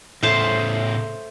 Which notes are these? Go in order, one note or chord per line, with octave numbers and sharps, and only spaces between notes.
A2 C#3 A3 C5 A5